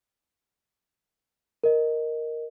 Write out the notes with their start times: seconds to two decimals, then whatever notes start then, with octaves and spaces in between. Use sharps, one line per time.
1.64 A#4 D#5